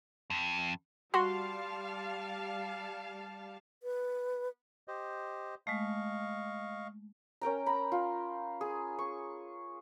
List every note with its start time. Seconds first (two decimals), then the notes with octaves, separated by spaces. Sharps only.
0.30 F2
1.14 G3 F#4 F5 A5 C6
3.83 B4
4.88 G4 C5 D#5
5.67 G#3 A3 D#5 F5 C#6
7.42 C#4 A#4 G5 A#5
7.66 A#5 B5
7.92 F4
8.61 G#4
8.99 C#6